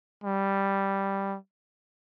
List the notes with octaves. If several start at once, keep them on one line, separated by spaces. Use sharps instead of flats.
G3